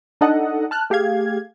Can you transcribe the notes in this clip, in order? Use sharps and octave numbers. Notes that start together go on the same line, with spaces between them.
D4 D#4 A4 D#5 F#5
A5 F6 F#6
A3 G4 G#4 F5 G#6